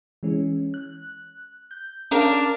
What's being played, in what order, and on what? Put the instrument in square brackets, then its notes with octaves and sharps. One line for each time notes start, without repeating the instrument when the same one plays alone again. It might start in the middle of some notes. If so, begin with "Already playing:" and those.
[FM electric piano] E3 G#3 C#4
F#6
G6
[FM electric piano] C#4 F5 [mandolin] D4 A#4